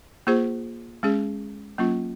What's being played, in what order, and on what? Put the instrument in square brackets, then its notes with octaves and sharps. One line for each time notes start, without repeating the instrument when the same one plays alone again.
[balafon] A#3 F4 G#4 C5
G#3 C#4 G#4
F#3 A#3 C#4 F4